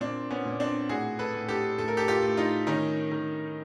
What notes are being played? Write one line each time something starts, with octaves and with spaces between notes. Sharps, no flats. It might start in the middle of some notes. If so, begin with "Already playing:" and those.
A#2 C4 D4
B3 C#4
A#2
C4 D4
A2 F#4 G#4
A4 B4
A2
G4 A4
A2 A4
A#4
G4 A4
F4 G4
A2
D#4 F4
D#3 C#4 D#4
D#3